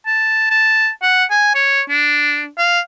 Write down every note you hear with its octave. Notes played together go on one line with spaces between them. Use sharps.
A5
A5
F#5
G#5
C#5
D4
F5